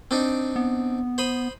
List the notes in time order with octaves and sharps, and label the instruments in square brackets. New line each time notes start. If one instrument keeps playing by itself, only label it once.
[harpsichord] C4 D4 D#4
[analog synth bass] B3
[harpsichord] C5 B5 D#6